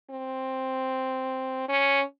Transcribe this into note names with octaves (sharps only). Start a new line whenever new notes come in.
C4
C#4